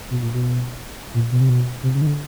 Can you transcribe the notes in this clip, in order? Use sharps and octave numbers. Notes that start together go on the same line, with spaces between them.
B2
A#2
B2
A#2
B2
C3
B2
C3
C#3
D#3
D3